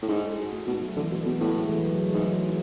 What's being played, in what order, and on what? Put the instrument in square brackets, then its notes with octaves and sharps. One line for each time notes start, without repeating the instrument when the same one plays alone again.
[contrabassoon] A2
[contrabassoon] G#2 [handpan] D4
[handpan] G#4
A4
F#4
A3
[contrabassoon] B2 [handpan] A3
[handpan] F#3
[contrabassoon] D3 [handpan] E3
[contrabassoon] B2 [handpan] G#3
[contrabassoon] B2 [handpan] B3
[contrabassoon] A2 [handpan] A3
[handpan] A3
G#3
E3
F#3
G#3
A3
[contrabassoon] G#2 [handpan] F#3
[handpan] E3